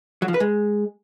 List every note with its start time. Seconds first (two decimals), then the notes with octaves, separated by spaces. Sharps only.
0.22 F#3
0.28 F3
0.34 B4
0.40 G#3